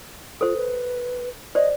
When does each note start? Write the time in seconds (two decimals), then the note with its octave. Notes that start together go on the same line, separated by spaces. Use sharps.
0.41 F4 A4 C5
0.56 B4
1.55 C5 D5 D#5